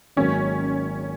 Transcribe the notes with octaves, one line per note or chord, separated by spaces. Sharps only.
G#1 G#2 F#3 A#3 C#4